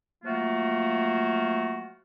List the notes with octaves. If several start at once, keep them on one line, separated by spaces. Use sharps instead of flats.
F3 F#3 A3 A#3 F4 F#4